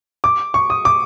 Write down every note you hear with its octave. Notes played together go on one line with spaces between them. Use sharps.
D6
C#6
D#6
D6